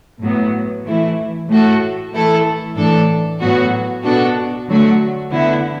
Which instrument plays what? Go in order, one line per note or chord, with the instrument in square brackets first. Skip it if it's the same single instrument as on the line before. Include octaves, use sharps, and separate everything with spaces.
[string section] A2 F#3 B3
E3 A3 E4
A2 A3 F#4 A4
E3 A3 E4 A4
A2 E3 D4 A4
A2 F#3 B3 F#4
B2 B3 D4 F#4 A4
D3 F#3 A3 F#4
D3 B3 E4